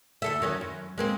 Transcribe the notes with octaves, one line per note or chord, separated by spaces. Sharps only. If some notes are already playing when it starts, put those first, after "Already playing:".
D2 A4 E5
D#3 F#3 C#4
F#2
G#3 A#3 C4